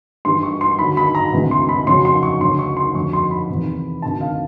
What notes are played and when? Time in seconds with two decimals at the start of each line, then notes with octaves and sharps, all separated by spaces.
0.25 G2 E3 G3 C6
0.43 C#6
0.61 C6
0.79 D#2 D3 F#3 B5
0.97 B5
1.15 A#5
1.33 D2 C3 E3 G#3
1.51 C6
1.69 B5
1.87 F2 C#3 F#3 C6
2.05 C6
2.23 C#6
2.41 D2 C#3 F#3 C6
2.59 C#6
2.77 C6
2.95 F2 D3 F#3 C#6
3.13 C6
3.31 B5
3.49 E2 C3 D#3
4.02 D2 C3 D#3 A5
4.21 F5